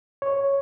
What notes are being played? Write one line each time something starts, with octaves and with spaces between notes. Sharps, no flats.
C#5